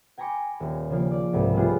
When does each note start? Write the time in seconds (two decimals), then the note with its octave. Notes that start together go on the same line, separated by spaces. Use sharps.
0.18 G5 G#5 A#5 B5 C#6 D6
0.60 D#1
0.90 C#3 F3 A#3
1.11 D5
1.33 C2 G#2 B2
1.54 G3 A3 B3 C#4 F4 G#4